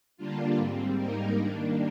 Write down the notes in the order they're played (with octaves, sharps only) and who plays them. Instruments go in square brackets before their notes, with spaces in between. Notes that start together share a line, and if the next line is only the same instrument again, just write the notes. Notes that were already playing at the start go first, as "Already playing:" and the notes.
[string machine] D3 G3 A#3 D4 F4
G#2 G3 C4
G#2 G3 A#3 D#4 A#4
D#3 G3 A#3 D4